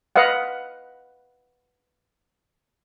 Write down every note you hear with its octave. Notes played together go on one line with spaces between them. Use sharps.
B4 D#5 F5 F#5